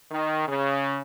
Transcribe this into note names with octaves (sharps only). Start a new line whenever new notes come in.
D#3
C#3